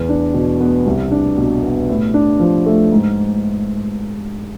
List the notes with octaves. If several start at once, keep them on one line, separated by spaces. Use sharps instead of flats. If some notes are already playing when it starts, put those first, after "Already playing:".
Already playing: E2
D4
B2
B3
C2
D4
B2
B3
A2
D4
F3
A3
G#2